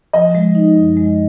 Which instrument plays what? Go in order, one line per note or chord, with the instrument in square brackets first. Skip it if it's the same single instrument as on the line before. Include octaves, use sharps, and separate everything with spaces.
[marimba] F3 [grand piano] D#5
[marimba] G#3
D#4
F#2
G#3